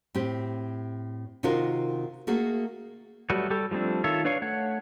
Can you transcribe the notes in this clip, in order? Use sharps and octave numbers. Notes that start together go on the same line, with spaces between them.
A2 C4 G4
C3 D#3 D#4 F4 F#4 A#4
A3 A#3 F#4 G#4 A#4
F#3 G3 A3 F#4 B4
G3 G4 A4 C#6
F3 G3 A3 C4 D4
D#3 F4 A4 C#5 E5
D4 B4 C#5 F5 C#6
A3 C#5 F#5